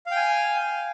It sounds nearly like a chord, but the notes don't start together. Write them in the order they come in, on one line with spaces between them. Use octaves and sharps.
F5 G5 G#5